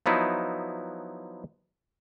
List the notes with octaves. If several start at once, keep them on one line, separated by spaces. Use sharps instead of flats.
F3 F#3 B3 D#4 E4